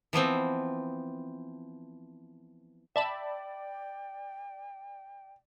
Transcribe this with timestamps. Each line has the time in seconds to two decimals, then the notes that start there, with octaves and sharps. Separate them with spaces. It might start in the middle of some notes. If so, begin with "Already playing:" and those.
0.13 E3 F3 B3 C4
2.96 D5 E5 G5 A5 B5